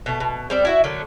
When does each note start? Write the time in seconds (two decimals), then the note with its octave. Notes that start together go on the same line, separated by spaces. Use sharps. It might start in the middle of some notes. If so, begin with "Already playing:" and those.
0.06 B2 A3
0.20 B2
0.50 G3 C4 D5
0.65 E4 F#4 E5
0.84 D3 F#3 A3 A#3